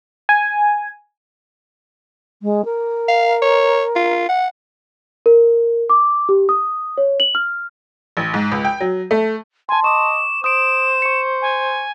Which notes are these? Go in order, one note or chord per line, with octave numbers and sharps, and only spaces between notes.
G#5
G#3
A#4
F5
C#5
F4
F#5
A#4
D6
G4
D#6
C#5
F#7
F6
A1
G#2
C#2
G5
F#3
A3
G#5 A5 C6
D#5 C#6 D6 E7
C5 D#6 D7 E7
C#6 C#7
G#5